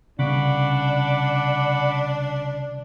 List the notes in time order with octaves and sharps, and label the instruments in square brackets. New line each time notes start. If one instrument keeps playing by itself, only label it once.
[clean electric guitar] C2 C#3 [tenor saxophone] D4 [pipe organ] F#5 B5 D6